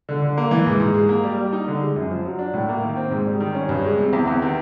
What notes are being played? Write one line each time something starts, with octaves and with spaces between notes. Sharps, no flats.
D3
D3
A#3
E3
G#2
G#2
G#3
A#3
G3
G3
D#4
D3
G#3
F#2
F3
F#3
D4
A2
A#3
D#3
C4
G#2
G3
D#3
C#4
G2
G#3
C3
E2
E2
D#3